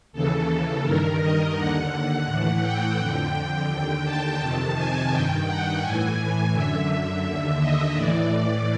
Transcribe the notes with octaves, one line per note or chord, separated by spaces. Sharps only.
D#2 C#3 E3 A4
A4
G2 D#3 A#4
D#5
D#2 D3 F#5
A2 E3
G5
F2 D3
G5
D#2 D3
A5
F2 C3 D#3
G#5
G2 D#3 G5
F#5
A2 E3 G#5
F#2 D3 E5
D#2 D3
D#5
A2 E3 D5